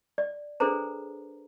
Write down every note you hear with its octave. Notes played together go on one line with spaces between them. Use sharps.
D5
D4 G#4 A4 B4 C5 A#5